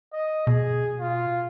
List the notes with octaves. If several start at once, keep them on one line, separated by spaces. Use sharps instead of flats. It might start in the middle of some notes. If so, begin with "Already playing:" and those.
D#5
B2 G#4
F4